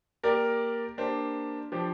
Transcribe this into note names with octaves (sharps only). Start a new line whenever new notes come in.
A#3 G4 A#4 D5
A#3 D4 G4 C5
F3 D4 G4 C5